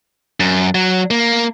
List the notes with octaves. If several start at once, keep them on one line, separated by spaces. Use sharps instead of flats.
F#2
F#3
A#3